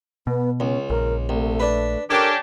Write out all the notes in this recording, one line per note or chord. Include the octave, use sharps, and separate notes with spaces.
B2 B3
C#2 C#4
A#1 A#4
C2 A3
D4 B4
C#4 D4 G4 A4 A#4